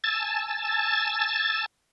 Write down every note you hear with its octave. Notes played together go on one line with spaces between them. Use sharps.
G#5 A5 E6 A6